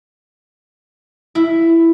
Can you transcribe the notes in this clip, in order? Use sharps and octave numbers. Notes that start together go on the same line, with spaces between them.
E4